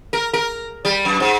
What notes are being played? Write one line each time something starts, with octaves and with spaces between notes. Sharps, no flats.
A#4
A#4
G3
F#2
G#2